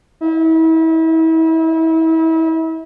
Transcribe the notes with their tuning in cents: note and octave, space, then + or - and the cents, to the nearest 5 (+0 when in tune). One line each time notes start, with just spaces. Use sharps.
E4 -35